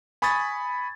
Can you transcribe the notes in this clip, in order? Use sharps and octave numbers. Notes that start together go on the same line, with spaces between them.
G#5 B5 C#6 D#6 G#6 A6